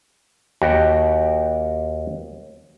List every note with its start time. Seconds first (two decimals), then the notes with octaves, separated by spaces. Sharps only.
0.62 D#2 F#4 G4 G5